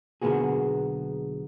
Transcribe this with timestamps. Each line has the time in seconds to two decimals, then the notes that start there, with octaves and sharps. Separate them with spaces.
0.22 B1 D3 A#3 B3 F#4 G#4